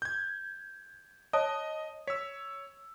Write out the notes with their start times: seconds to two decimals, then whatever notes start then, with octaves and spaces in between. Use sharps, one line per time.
0.02 G6 G#6
1.33 C#5 D#5 A5 D#6
2.07 C#5 E6 B6